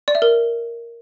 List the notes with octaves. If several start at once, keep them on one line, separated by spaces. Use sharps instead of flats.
D5
E5
A#4